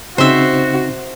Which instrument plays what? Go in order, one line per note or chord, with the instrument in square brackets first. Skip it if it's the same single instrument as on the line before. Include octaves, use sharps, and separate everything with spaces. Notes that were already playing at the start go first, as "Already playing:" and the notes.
[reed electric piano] C#3 C4 D#4 [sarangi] F#4 [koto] C5 E5